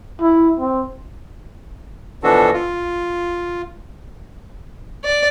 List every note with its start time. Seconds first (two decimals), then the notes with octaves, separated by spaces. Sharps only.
0.21 E4
0.60 C4
2.23 B2 E3 F3 D4 F#4 A4
2.53 F4
5.04 D5